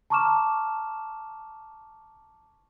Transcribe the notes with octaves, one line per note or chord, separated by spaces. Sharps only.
A5 A#5 C#6 D6 F6 E7